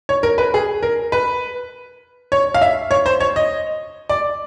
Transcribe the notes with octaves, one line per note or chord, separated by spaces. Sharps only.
C#5
A#4
B4
G#4
A#4
B4
C#5
F5
E5
C#5
C5
C#5
D#5
D5